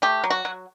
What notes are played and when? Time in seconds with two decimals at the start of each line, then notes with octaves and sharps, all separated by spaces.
0.02 A3 G4
0.24 F#3
0.30 F#4
0.45 F#3